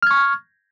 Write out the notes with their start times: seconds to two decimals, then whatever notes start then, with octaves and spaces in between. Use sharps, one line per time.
0.03 F6
0.07 G#6
0.11 C#6